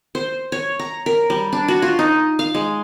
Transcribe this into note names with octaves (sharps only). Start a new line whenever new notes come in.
C5
C#5
A#5
A#4
G3
D4
F#4
F4
D#4
F5
G#3